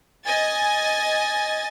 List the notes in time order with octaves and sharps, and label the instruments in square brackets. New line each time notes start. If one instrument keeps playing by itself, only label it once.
[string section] D#5 G#5 A6